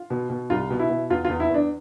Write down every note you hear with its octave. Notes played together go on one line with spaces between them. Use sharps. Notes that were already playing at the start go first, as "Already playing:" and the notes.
Already playing: F4
B2
B2
C2 F4
B2
E4
B2
E2 F4
E2 F4
E4
E2 D4